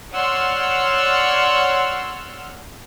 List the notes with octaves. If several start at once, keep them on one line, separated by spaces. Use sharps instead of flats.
C#5 D5 F#5 C6 E6 F6